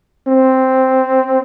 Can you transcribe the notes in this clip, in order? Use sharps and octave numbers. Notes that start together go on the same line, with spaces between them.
C4